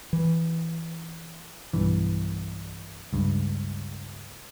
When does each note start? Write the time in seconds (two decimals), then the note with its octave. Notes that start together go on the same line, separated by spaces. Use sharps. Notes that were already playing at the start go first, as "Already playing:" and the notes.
0.13 E3
1.73 B1 G2 E3
3.13 C#2 G2